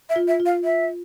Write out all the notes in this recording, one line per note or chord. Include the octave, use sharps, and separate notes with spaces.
E5
F4
E5
F4
F5
E5